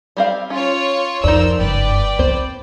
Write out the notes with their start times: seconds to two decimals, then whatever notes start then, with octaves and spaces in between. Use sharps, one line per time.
0.17 G3 C4 F5
0.50 C#4 F4 C#5
1.24 F2 D4 D#4 A#4 C5 E6
1.59 F#1 G2 B4 D5 G5
2.19 C4 E4 C5